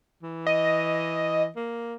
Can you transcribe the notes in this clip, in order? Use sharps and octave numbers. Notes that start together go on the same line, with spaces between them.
E3
D#5
A#3